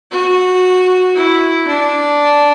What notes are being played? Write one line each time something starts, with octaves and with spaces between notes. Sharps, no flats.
F#4
E4
D4